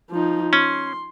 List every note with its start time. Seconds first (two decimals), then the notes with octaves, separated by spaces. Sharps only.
0.10 F3 D#4
0.53 C#4 C6